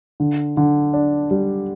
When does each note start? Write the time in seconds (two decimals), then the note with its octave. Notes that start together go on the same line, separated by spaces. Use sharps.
0.20 D3
0.57 D3
0.93 D4
1.31 G3